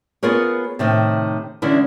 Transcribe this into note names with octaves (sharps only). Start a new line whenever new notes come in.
B3 F4 G#4 A#4 C#5
A2 C3 D#3
D3 E3 G#3 C#4 E4